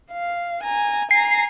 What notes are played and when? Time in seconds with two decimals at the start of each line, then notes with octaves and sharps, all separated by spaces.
0.12 F5
0.63 G#5 A#5
1.11 G#5 A#5 C7